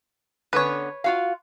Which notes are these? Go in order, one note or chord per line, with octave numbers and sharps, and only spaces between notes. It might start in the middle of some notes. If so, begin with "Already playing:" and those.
D3 B3 C#4 B4 C#5
F4 F#4 F5